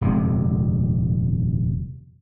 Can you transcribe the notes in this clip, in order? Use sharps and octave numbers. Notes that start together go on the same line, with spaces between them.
D#1 F2 C3 G#3